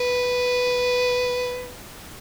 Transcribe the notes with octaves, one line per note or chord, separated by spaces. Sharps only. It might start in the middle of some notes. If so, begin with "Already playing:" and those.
Already playing: B4